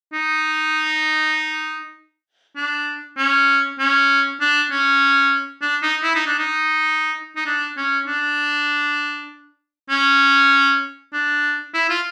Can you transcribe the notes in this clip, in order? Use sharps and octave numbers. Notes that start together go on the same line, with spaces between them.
D#4
D4
C#4
C#4
D4
C#4
D4
D#4
E4
D#4
D4
D#4
D#4
D4
C#4
D4
C#4
D4
E4
F4